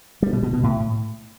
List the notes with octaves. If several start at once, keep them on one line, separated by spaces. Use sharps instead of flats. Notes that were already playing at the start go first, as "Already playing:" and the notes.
G3
B2
B2
B2
A2